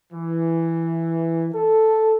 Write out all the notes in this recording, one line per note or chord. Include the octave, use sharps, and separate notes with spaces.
E3
A4